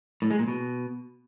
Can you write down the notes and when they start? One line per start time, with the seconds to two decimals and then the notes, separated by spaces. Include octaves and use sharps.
0.22 A2
0.31 G#3
0.39 A#2
0.48 B2